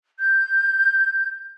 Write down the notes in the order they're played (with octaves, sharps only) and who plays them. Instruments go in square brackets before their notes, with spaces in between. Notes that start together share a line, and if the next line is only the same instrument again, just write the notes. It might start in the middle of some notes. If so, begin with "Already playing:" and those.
[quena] G6